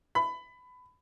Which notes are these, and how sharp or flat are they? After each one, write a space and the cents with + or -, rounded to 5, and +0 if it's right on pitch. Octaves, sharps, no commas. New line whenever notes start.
B5 +20